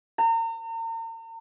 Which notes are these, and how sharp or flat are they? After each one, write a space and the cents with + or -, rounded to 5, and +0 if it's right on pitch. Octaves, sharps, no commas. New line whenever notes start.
A#5 -40